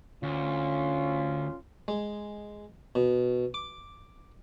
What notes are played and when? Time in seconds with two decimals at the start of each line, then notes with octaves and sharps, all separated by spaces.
0.23 D2 C#4 F4
1.88 G#3
2.95 B2
3.54 D6